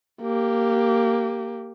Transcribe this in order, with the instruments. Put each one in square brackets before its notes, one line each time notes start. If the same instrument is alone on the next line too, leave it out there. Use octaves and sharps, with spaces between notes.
[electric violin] A#3 G4